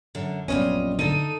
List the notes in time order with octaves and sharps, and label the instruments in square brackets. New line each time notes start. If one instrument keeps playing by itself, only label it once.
[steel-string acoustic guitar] F#2 D3
[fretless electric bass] A#1 F#2 B3 [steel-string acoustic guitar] G3 F4 D#5 [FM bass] C#4
[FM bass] D3 [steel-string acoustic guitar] D#4 A4 [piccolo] D#7